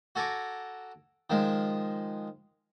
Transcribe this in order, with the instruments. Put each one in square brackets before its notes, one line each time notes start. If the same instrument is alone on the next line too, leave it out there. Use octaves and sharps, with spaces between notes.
[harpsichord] F#4 A4 G#5 A#5 D6
D#3 F3 G#3